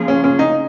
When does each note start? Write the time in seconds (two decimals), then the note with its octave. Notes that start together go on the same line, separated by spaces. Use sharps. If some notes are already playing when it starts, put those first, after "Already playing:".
Already playing: C#3 F3 A#3 F4 G#4
0.08 C#4
0.24 C#4
0.39 D#4